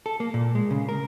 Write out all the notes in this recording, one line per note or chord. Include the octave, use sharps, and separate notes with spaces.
A4
A#3
A#2
G#3
C#3
A#4